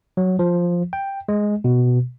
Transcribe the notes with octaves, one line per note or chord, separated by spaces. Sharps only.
F#3
F3
G5
G#3
B2